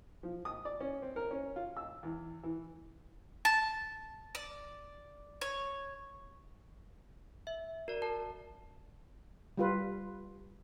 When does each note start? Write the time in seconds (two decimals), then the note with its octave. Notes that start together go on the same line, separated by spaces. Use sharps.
0.23 F3
0.45 D#6
0.65 D5
0.81 C#4
1.02 C4
1.16 A#4
1.31 C#4
1.56 F4
1.77 E6
2.03 E2
2.43 E3
3.45 A5
4.35 D5
5.41 C#5
7.47 E5
7.88 F#4 A#4 D5
8.02 A#4 A5
9.58 G3 F4 B4